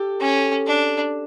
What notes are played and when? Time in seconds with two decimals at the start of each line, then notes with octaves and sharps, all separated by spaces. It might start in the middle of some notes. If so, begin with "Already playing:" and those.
Already playing: G4 A4
0.21 C#4
0.67 D4